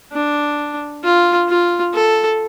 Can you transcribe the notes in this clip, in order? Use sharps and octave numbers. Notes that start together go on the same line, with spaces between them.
D4
F4
F4
A4